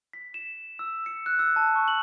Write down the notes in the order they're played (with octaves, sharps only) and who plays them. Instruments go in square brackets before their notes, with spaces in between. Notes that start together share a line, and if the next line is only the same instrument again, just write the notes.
[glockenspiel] B6
E7
E6
C#7
F#6
E6
A5
C#6
F#7